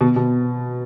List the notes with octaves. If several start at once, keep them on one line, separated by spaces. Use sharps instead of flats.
B2
B2